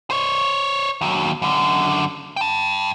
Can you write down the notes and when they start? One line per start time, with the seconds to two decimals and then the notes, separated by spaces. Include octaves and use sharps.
0.10 C5 C#5
1.01 D#2 F#3
1.42 F#2 D3
2.37 G5 A5